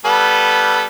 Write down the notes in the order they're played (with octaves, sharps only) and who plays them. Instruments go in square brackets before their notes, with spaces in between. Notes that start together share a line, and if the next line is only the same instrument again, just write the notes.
[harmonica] G3 B3 A4